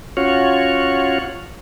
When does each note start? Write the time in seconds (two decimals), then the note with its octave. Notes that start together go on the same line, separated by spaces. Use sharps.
0.17 C#4 F4 F#4 C#5